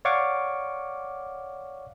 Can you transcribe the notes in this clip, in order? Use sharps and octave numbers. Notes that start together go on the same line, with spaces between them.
C#5 D5 F5 F#5 C#6 D6